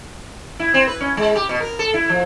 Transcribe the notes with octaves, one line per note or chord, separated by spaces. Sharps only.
E4
C4
B4
C#4
G#3
G4
B2
A#4
A4
E4
F3